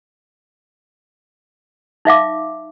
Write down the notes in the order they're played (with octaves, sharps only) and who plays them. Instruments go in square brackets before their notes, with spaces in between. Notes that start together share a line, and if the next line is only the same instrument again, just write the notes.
[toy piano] D#4 E5 F5 D6